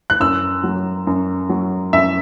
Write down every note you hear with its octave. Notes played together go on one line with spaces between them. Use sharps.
F#6
F#2 E6
F#3
F#2
F#3
F#2 E5